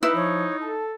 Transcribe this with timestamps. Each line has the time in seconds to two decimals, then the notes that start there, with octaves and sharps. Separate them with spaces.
0.03 D#4 E4 B4
0.15 F3 C#5
0.61 A4 A5